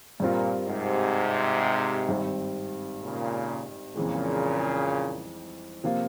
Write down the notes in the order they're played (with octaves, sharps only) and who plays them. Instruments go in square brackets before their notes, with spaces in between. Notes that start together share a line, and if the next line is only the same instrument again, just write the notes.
[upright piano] G2 G3 C4 F4 A#4 [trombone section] A#2
[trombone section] G#2 C3
[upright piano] G#1 G2 G3 C4
[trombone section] A#2 C#3
[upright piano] F2 E3 G#3 [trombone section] A#2 C#3
[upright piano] C3 F3 A#3 F4